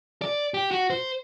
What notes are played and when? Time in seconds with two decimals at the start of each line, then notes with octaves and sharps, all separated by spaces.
0.22 D5
0.54 G4
0.71 F#4
0.90 C5